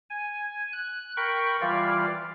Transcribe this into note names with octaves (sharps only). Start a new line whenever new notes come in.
G#5
F#6
A#4 G5 B5 C#6
E3 G3 F4 D5 F5